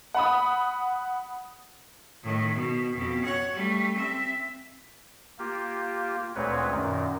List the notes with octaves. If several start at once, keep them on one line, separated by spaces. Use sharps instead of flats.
F#5 B5 D#6
A2 D#3
B2
F2 B2
C#5 F#5
G3 A3
C4 E5
A#3 F4 G4
D2 A#2 G#3 C4 B4 C#5
F#2 A#2 D#3